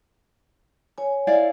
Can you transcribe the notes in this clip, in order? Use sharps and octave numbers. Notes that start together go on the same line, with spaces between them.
C#5 G#5
E4 D5 F5